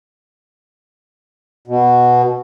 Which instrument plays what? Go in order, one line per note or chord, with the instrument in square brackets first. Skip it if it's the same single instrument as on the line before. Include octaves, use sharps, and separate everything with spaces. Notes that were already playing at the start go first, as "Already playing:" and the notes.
[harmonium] B2